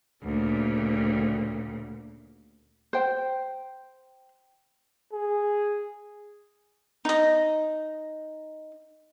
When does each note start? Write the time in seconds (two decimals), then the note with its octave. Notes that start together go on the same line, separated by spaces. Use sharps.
0.22 D2 A#2 C#3
2.93 C5 G5
5.13 G#4
7.05 D#4 D#5